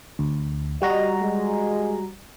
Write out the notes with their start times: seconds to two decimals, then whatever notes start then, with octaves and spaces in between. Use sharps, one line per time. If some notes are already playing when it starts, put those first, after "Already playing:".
0.19 D2
0.82 G3 F#4 D#5 A#5
1.21 G#3